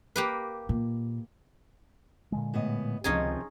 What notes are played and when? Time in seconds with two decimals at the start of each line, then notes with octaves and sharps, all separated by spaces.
0.16 A#3 G4 B4
0.69 A#2
2.32 A#2 D3 G#3
2.54 A2 B3 D#5
3.04 D#1 C#2 C3 D#3 F3 C#4 D#4 G#4